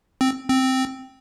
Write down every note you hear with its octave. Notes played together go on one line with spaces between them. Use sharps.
C4
C4